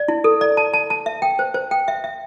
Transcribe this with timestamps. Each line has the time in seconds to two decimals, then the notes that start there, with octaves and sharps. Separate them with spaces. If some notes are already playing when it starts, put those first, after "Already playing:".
Already playing: D5
0.08 E4
0.24 A4
0.41 D5
0.57 A5
0.73 A5
0.90 A5
1.06 E5
1.22 G5
1.39 C5
1.54 C5
1.71 G5
1.88 E5
2.04 E5